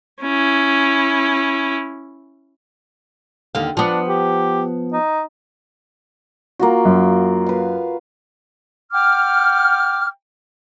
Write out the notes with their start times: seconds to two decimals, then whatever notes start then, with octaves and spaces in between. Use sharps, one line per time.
0.22 C#4 E4
3.55 D#2 D3 F5
3.77 F3 B3 D4
4.08 G4
4.93 D#4
6.59 A#3 F4 F#4
6.85 F#2
7.46 B4 F5
8.92 F#5 G5 D6 F6